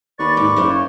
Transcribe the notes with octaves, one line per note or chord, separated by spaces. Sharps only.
D#2 B4 D5 C#6 A6
G#2 D6
F#1 F#2 C5 F5
C#5